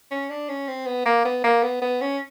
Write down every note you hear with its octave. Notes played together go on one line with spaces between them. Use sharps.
C#4
D4
C#4
C4
B3
A#3
B3
A#3
B3
B3
C#4